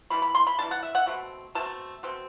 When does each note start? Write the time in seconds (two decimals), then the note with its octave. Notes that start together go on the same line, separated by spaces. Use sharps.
0.10 E3 G3 D4 B5
0.22 B5
0.35 C6
0.47 B5
0.58 E3 G3 D4 A5
0.71 F#5
0.83 E5
0.95 F#5
1.07 B2 A3 C4
1.55 B2 A3 C4 A5
2.03 B2 A3 C4